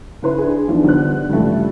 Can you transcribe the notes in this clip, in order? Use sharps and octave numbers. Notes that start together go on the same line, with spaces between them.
C#3 E4 B4 C5 C6
D4 G#4
E3 F3 B3 D4 D#4
D3 G3 B3 C5 F#6
G2 C#3 E3 F3 G3 A3